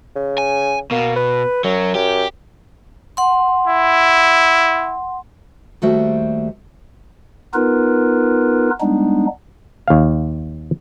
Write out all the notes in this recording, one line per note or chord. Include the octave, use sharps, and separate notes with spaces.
C#3
G#5
B2 A#3
B4
F#2 F#3
F#2 G4
F#5 C6
E4
D#2 G3 A3 F#4 C5 E5
B3 D#4 F4 A#4 B4
G3 G#3 B3 D4 D#4
D#2 F5